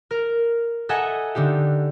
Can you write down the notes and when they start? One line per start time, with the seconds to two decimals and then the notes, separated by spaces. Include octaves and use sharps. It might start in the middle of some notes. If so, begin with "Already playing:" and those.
0.11 A#4 F6
0.89 A4 D#5 E5 F#5 G#5 A#5
1.35 D3 D4 D#4 G4